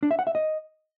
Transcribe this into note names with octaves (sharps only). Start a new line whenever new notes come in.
D4
E5
F#5
E5
D#5